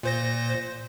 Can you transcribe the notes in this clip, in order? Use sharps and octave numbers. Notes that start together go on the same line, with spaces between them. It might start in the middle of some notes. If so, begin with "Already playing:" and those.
A#2 C5 A#6